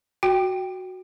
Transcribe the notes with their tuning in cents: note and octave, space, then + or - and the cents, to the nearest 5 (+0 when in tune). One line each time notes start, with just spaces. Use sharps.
F#4 +0 G5 +0